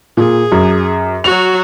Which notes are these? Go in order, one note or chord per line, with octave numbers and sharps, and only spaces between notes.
A#2 G#4
F#2
F#3 F#4 F7